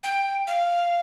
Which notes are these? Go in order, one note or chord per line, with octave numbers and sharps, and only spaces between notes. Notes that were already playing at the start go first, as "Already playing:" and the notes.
G5
F5